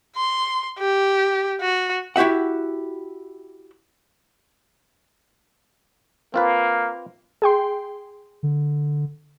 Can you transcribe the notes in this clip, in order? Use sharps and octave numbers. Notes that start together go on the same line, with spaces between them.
C6
G4
F#4
E4 F#4 G4 E5 F#5
A#3 C4 F4 B4
G#4 G5 C6
D3